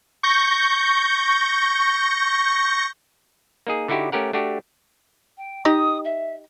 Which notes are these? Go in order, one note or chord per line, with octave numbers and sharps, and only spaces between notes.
C#6 G6 A#6
A#3 D#4 G#4
D3 D#4 E4 F#4 G4
A3 C#4 G4 A#4 F#5
A3 D4 F#4 G4
G5
D#4 G4 D#5 D#6
E5